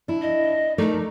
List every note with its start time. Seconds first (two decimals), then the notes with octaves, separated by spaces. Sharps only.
0.08 D4 E4
0.22 D#5
0.78 A3 D#4 A#4 D5